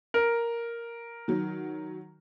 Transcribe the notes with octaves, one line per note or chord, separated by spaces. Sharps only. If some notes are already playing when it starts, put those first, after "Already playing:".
A#4
D#3 F#3